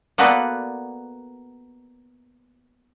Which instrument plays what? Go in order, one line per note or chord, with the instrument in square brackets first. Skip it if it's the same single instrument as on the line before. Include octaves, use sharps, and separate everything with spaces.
[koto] A#3 B3 F#4 A4 B4 D5